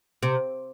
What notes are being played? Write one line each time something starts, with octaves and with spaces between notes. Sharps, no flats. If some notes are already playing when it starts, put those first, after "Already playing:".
C3